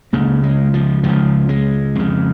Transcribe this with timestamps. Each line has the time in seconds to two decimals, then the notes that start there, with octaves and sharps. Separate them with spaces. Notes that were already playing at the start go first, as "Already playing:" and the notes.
0.13 C#2 C#3 A#3
0.43 G#3
0.74 F3
1.03 C#2 C#3 F3
1.49 G#3
1.95 F2 C#3